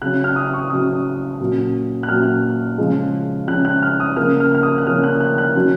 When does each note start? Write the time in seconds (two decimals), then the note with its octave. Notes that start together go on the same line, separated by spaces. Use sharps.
0.02 C#3 F#3 C#4 F#6
0.24 F6
0.36 D#6
0.54 C#6
0.70 C#3 F#3 C#4 D#6
1.40 A#2 F#3 C#4
2.03 F#6
2.09 A#2 F#3 C#4 F6
2.78 C#3 F3 G#3 C#4
3.47 C#3 F3 G#3 C#4 F#6
3.65 F#6
3.82 F6
4.00 D#6
4.16 C#3 F3 A#3 C#4 F6
4.40 F6
4.55 F6
4.63 D#6
4.78 F#6
4.86 C#3 F3 A#3 C#4 F6
5.04 F#6
5.20 F#6
5.38 F#6
5.55 D#3 F#3 C#4